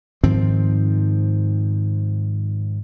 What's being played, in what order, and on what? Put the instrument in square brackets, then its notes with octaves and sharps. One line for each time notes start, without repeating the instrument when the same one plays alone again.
[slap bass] G#2 D#3 F3 C4